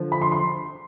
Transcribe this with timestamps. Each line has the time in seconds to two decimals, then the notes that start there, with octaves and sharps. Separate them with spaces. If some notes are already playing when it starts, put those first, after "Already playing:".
Already playing: D3 F3
0.12 B5
0.22 C6
0.32 C6